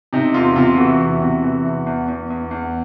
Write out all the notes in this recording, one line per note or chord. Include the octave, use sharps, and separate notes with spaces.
C3 D#4
E2 F4
C3 F4
E3 F#4
E2
C3
E3
E2
E2
E2
E2
E2